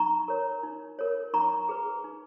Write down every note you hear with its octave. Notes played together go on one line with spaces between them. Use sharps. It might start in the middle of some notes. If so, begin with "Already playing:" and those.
Already playing: D#4 A#5 C#6
A#4 C#5
D#4
A#4 C#5
D#4 A#5 C#6
G#4 B4
D#4